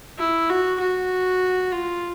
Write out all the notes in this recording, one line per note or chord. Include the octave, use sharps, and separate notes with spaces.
E4
F#4
F#4
F4